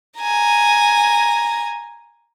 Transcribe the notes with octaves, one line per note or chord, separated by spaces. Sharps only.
G#5 A#5